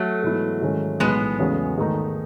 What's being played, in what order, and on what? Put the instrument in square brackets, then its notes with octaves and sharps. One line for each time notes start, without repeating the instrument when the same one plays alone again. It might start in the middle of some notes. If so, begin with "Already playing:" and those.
Already playing: [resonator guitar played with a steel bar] F#3 A3
[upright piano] G#2 E3 B3 E4
G#2 D#3 G#3 C#4
[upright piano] B1 A2 E3 [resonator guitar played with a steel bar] G#3 B3
[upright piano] E2 C#3 F#3 A3 C#4
G#2 D#3 A3 D#4